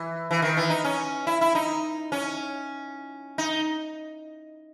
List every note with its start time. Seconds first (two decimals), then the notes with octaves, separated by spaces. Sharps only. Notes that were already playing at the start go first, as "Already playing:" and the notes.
Already playing: E3
0.31 E3
0.42 D#3
0.57 E3
0.70 D#4
0.84 C#4
1.27 E4
1.41 E4
1.55 D#4
2.12 C#4
3.38 D#4